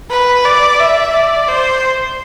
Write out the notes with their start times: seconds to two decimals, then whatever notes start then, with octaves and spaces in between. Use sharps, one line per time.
0.10 B4
0.45 D5
0.79 E5
1.13 D5
1.48 C5